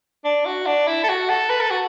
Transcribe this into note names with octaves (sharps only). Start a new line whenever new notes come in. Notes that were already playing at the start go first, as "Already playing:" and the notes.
D4
F#4
D4
E4
A4
F#4
A4
B4
A4
F#4